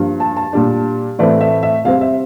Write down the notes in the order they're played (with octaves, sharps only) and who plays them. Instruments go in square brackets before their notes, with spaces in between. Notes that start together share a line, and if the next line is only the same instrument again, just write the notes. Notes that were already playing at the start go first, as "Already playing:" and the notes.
Already playing: [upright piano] G2 F3 A#3 D4
A5
A5
A#2 G3 D4
A2 E3 A3 C4 D5
E5
E5
C3 G3 C4 F5
E5